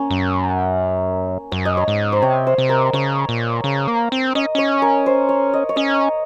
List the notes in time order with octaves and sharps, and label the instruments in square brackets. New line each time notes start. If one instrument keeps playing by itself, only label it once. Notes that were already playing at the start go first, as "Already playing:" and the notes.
Already playing: [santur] A#3 C#4
[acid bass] F#2
[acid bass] F#2 [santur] C#5
[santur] D#5
C#5
[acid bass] G#2
[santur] C5
[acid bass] C3 [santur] C#5
[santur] C5
[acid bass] C3
[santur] A#4
[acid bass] C#3 [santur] C#5
[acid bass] A#2
C#3
A#3
C4
[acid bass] C#4 [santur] D#5
[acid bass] C#4 [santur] C#5
[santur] A#4
C5
C#5
D#5
C#5
[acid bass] C#4 [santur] D#5